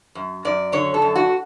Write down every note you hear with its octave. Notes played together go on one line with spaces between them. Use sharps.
F#2
F#2 D5
D3 C#5
A4
F#2
F#4